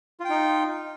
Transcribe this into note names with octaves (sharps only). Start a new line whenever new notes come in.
D#4 F4 G5